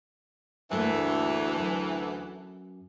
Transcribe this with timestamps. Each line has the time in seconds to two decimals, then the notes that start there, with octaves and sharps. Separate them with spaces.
0.71 D2 G2 E3 A3 A#3
1.57 F#2